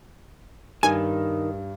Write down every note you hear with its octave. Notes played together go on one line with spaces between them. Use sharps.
G2 D#3 G#5